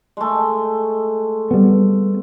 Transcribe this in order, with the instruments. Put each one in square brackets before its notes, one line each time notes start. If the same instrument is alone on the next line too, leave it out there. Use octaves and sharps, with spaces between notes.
[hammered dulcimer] G#3 A3
[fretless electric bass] G3 B3